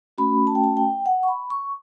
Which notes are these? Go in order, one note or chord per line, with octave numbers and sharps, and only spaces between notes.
A3 C#4 F#4 B5
A5
G5
A5
G5
F#5
C#6
B5
C#6